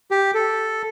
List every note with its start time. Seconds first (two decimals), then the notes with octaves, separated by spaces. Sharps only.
0.11 G4
0.34 A4